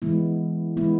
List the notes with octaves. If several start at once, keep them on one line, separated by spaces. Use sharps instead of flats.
E3 G#3 B3 E4
E3 G#3 B3 E4